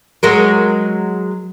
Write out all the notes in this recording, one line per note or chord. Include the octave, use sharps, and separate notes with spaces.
F#3 G#3 A#4